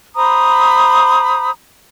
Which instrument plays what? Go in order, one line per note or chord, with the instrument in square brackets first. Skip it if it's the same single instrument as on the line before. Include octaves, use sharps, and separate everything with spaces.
[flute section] C5 A#5 B5 D#6